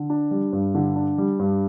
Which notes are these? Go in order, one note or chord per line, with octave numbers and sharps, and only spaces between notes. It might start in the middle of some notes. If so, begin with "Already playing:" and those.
Already playing: D3
D4
G3
G2
D3
D4
G3
G2